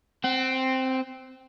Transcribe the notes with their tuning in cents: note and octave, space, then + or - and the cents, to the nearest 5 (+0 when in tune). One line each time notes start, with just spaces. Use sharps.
C4 +0 F#5 +40